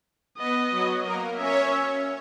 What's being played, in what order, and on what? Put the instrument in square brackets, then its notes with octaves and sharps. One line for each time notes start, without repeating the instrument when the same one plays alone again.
[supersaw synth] B3 B4 [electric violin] D#5
[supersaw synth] F#3 F#4
A#3 A#4
[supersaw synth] C#4 C#5 [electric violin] E5